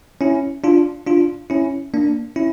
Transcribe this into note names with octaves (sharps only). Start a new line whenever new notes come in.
C#4 E4
D4 F4
D4 F4
C#4 E4
A#3 D4
C#4 E4